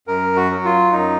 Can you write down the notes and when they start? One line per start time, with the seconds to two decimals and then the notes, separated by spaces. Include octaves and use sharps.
0.07 F#2 A#4
0.36 F#4
0.51 F#3
0.65 F4
0.92 F#2 D#4